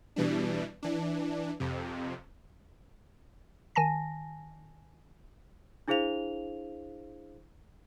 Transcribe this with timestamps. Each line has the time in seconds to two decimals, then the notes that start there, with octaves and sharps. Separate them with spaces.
0.16 B2 E3 G3 D4
0.83 E3 D4
1.60 F2 C3
3.76 D#3 G#5 A5 A#6
5.88 D4 E4 G#4 C5 F5 F7